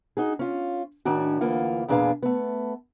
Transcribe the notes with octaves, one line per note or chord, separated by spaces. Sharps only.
D#4 F#4 G#4
C#4 F4
A2 D#3 C#4 D4 F#4
D2 E3 A#3 F4 F#5
E2 A#2 D4 G#4 B4 F5
A3 B3